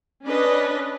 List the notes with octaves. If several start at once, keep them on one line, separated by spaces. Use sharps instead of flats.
C#4 D4 B4 D#5